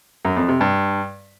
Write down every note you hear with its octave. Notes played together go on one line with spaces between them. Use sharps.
F#2
F2
C3
G2